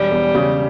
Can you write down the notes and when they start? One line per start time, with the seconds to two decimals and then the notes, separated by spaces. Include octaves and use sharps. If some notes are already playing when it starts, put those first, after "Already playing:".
Already playing: E1 G3
0.12 E2
0.35 C#3